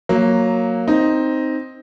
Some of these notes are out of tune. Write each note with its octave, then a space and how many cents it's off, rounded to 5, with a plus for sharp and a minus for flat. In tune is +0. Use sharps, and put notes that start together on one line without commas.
F#3 +0 A#3 +0
C4 +0 D#4 +0